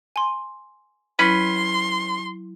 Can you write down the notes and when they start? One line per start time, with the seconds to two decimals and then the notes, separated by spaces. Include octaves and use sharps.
0.16 G#5 C6
1.19 F#3 C#4 E4 B4 B5 C6